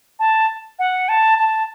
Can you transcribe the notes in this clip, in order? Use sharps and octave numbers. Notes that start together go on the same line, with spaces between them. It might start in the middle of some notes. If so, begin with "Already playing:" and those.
A5
F#5
A5
A5